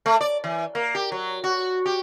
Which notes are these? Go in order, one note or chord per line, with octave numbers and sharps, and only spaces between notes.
A3
D5
E3
A#3
G4
F#3
F#4
G4